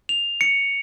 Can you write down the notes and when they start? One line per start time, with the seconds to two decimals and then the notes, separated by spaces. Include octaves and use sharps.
0.09 F7
0.41 C#7